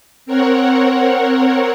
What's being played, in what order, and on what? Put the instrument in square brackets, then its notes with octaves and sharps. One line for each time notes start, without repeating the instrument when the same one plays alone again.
[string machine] C4 A#4 C#5 F#5